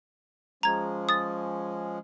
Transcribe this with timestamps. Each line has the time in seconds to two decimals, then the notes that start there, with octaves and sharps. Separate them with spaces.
0.63 F3 G#3 C#4 A#5 G#6
1.09 D#6 A6